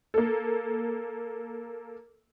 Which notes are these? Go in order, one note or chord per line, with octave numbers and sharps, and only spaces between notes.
A#3 A4